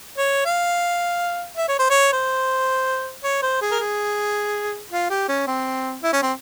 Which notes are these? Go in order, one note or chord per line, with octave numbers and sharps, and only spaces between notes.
C#5
F5
E5
C#5
C5
C#5
C5
C#5
C5
G#4
A#4
G#4
F4
G4
C#4
C4
E4
C#4
C4